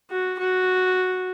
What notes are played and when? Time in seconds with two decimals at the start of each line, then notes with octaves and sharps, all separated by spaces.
0.11 F#4
0.39 F#4